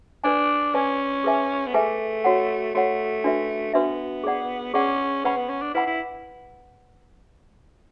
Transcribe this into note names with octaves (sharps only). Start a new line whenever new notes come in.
D4 B4 D5 G#5
C#4 B4 D5 G#5
G#4 B4 E5 G#5
B3
A3 G#4 B4 E5 G#5
F#4 C#5 F#5
A3 F#4 C#5 F#5
D4 F#4 B4 E5
B3 D4 F#4 B4 E5
G#4 D5 F#5
C#4 G#4 D5 F#5
C#4 B4 F#5 B5
B3
C#4
D4
E4 B4 F#5 B5
E4